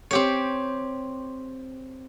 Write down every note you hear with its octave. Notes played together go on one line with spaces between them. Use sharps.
C4 G4 C#5